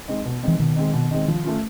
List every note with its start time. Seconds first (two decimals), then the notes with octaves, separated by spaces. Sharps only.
0.08 G#3 C4 D#4
0.25 B2
0.43 E3 G#3 C4 D#4
0.59 B2 D#3
0.76 G#3 C4 D#4
0.93 B2
1.11 G#3 C4 D#4
1.28 F3
1.44 A3 C#4 F4